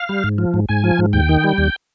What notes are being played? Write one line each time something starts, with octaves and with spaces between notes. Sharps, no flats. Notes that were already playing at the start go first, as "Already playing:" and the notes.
Already playing: F5
G3
G#2
F3
G#2
G#2 G#5
F3
G#2
D#2 G5
D#3
G3
D#2